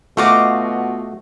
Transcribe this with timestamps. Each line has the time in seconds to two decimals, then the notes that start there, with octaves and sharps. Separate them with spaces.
0.17 B2 A3 F4 F#4 D#5 F5 D6